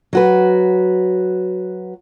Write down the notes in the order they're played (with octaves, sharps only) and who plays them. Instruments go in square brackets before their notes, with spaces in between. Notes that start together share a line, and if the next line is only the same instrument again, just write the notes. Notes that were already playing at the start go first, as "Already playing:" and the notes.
[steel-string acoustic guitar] F#3 F#4 B4